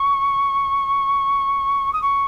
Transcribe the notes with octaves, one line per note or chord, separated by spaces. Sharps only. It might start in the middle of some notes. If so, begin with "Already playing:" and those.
Already playing: C#6
D#6
C#6